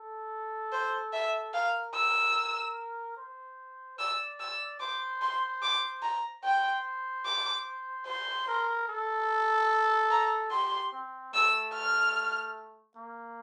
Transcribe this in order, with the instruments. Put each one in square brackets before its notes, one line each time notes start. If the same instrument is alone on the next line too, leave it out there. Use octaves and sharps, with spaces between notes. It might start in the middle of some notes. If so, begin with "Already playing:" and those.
Already playing: [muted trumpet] A4
[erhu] C5
E5
[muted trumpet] A#4 [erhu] F5
[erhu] E6
[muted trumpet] C5
[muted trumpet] D5 [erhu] E6
[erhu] E6
[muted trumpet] C5 [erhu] D6
[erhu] C6
D6
A#5
[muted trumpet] C5 [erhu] G5
[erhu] D6
[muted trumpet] C5 [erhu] C6
[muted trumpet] A#4
A4
[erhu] A#5
[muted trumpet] G4 [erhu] C6
[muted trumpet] C4
[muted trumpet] A3 [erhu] E6
[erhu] F6
[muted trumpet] A#3